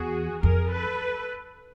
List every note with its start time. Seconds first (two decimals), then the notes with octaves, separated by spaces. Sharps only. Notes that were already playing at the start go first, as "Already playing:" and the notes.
Already playing: E2 F#4 G#4
0.43 F2 G#4 A#4
0.72 A4 B4